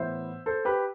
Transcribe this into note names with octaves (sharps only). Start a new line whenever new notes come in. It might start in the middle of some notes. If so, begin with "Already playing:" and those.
Already playing: A2 E3 B3 C5 E5
A4 C5
G4 B4